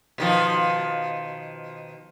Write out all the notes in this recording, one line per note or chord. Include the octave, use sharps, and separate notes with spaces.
B2 D#3 F3